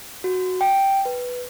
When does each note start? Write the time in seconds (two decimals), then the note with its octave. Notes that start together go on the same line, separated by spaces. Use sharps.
0.24 F#4
0.61 G5
1.05 B4